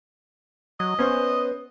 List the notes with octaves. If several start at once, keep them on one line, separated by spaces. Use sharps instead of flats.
F#3 D#5
B3 C#4 B4 C5